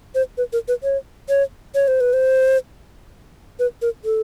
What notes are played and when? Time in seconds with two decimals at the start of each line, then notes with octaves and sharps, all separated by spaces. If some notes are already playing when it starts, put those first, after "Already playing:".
0.15 C5
0.38 B4
0.53 A#4
0.68 B4
0.83 C#5
1.29 C#5
1.75 C#5
1.88 C5
2.01 B4
2.13 C5
3.59 B4
3.82 A#4
4.05 A4